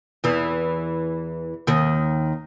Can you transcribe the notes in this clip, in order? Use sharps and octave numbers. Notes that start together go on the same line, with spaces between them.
E2 E3
D#2 D#3